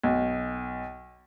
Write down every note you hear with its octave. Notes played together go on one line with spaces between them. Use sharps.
B1